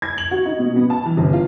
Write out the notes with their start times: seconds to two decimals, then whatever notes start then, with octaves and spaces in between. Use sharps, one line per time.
0.02 G#6
0.18 F#7
0.31 F#4
0.45 D#4
0.59 B2
0.76 B3
0.90 A5
1.06 E3
1.17 G1
1.33 F4